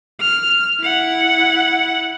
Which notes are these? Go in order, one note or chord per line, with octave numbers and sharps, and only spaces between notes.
F6
E4 F#5